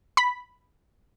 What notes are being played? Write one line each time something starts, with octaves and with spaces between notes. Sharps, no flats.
B5 B6